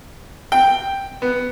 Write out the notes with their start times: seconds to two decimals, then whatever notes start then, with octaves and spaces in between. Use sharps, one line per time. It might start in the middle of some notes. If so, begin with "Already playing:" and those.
0.52 G5
1.22 B3